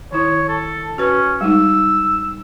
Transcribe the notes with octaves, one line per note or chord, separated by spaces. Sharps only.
D#3 E4 C#5
A4
C#4 F#4 B4
G3 G#3 D#4 E6